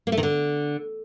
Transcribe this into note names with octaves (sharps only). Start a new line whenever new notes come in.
A#3
A3
D#3
D3